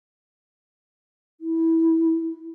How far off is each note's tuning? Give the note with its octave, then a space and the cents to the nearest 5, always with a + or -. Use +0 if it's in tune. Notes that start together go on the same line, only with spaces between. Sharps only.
E4 -15